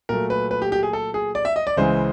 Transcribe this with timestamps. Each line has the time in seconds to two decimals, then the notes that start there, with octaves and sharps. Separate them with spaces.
0.09 A#2 F#3 A3 A#4
0.30 B4
0.51 B4
0.62 G4
0.72 G4
0.83 G#4
0.93 A4
1.14 G#4
1.35 D5
1.45 E5
1.56 D#5
1.67 D5
1.77 C#2 C#3 E3 G#3 C5